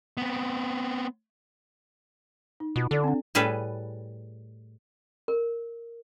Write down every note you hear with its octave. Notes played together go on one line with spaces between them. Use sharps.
B3 C4
D#4
B2 F4
D3 A4 D5
C4 D4
A2 G3 G#4 A4 B4
A#4